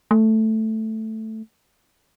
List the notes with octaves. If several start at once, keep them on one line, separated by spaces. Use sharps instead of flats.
A3